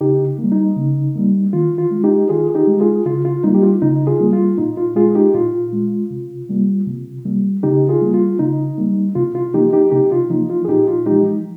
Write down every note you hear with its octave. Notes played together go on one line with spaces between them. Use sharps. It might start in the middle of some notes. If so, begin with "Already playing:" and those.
C#3 D#4 G4
G3 A#3
D#4
C#3
G3 A#3
D#3 F4
F4
G#3
D#4 G4
D#3 F4 G#4
G#4
D#4 G4
G#3
F4 G#4
C#3 F4
F4
G3 A#3 D#4
G4
F4
C#3 D#4
F4 G#4
G3 A#3
F4
A#2 D#4
F4
G#3 F4 G#4
D#4 G4
A#2 F4
G#3
C3
G3 A#3
C3
G3 A#3
C#3 D#4 G4
F4 G#4
G3 A#3
F4
C#3 D#4
G3 A#3
C3 F4
F4
F3 A#3 D#4 G4
D#4 G4
C3 D#4 G4
F4
F3 A#3 D#4
F4
G#4
A#2 D#4 G4
F4
F3 G#3 D#4 G4